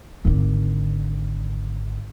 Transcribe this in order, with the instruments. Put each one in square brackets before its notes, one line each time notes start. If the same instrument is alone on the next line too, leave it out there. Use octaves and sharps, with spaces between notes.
[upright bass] G#1 D3